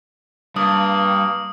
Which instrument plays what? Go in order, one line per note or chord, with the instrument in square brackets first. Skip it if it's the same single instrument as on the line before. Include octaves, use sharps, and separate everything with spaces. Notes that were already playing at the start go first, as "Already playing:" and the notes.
[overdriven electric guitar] G2 [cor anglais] A#3 [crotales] D#6